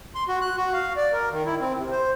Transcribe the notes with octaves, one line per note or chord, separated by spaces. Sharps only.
C6
F#4
F#6
F#4
F5
D5
A#4
D#3
E4
C4
C3
C5